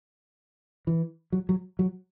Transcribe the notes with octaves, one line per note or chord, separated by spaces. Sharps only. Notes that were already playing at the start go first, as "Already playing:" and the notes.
E3
F#3
F#3
F#3